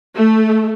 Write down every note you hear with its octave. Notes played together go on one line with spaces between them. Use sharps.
A3